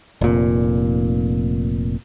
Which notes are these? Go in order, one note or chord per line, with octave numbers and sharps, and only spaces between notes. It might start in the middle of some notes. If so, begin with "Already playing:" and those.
F1 A#2